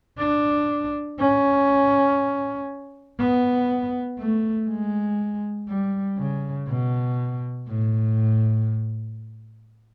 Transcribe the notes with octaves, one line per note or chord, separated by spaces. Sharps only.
D4
C#4
B3
A3
G#3
G3
C#3
B2
A2